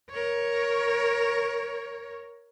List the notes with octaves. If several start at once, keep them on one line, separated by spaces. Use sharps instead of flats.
A#4 C#5